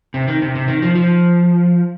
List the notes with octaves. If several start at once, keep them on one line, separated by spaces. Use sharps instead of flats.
C3
D#3
C3
C3
D#3
F3
F3